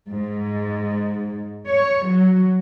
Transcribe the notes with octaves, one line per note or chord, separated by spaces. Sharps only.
G#2
C#5
F#3